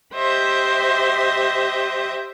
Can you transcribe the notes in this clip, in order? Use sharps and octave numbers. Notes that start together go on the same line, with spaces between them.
G4 C5 D#5 E5